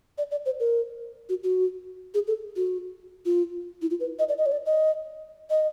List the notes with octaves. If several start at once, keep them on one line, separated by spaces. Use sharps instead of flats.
D5
D5
C5
A#4
F#4
F#4
G#4
A4
F#4
F4
E4
F4
B4
D#5
D5
D#5
C#5
D5
D#5
D#5